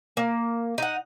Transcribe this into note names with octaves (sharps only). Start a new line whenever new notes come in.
A#3
D#4 F#5